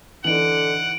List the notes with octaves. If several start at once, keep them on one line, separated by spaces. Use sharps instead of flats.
D3 E3 D#4 F#5 D7 F#7